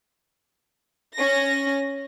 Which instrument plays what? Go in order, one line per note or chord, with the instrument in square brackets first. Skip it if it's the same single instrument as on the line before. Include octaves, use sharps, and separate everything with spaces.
[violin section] C#4 A#6